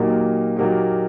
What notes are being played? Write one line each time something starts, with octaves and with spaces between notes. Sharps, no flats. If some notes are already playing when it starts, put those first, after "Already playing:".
Already playing: A#2 F#3 A#3 D#4 G4
A#2 F#3 A#3 D#4 G4